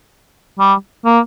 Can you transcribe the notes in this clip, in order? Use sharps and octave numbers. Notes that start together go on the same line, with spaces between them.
G3
A#3